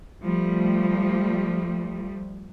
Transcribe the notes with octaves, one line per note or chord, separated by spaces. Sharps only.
F3 G3 A3